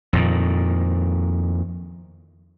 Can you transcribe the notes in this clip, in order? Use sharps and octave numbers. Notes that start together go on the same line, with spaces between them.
F2 A#2 D#3